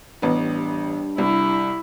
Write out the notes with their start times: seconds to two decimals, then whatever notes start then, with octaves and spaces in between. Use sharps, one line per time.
0.22 A1 G2 B3
1.18 C2 E4